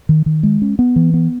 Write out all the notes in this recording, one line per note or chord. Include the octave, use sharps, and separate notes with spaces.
D#3
D#3
G#3
C#4
B3
E3
B3